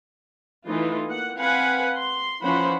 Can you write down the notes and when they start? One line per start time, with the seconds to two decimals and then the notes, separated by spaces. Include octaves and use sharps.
0.65 E3 A3 D#4 F4
1.07 A#3 F#5
1.39 C4 B4 F5 F#5 G#5
1.94 C6
2.42 E3 F3 C#4 C5 F#5 B5